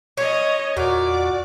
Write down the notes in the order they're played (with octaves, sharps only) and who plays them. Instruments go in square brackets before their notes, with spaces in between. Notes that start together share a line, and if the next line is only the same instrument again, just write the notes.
[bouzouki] C#4 [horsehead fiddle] C#5 D#5
[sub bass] E2 [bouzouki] A#2 [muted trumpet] F#4 [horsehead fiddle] D5